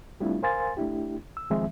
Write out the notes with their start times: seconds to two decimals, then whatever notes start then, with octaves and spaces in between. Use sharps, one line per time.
0.20 G3 A3 C4 D4 E4 F4
0.43 A#4 C5 F5 G#5 C6 A6
0.77 A3 D4 E4 G4
1.37 E6
1.50 C2 D#3 F3 G#3 C4 E5